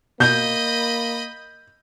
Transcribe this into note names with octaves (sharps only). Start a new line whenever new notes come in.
B2 A#3 D#5 B5 G6